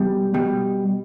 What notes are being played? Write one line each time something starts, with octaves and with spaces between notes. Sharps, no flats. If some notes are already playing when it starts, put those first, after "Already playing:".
Already playing: B2 G3
B2 G3